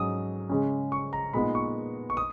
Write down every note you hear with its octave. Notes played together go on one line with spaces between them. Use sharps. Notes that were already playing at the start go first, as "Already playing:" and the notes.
Already playing: G#2 F#3 C#4 D#6
C#3 G#3 C#4
C#6
A#5
A#2 G#3 B3 D#4 B5
C#6
C#6
D#6